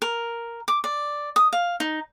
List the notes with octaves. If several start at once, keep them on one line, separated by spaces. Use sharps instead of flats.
A#4
D6
D5
D#6
F5
D#4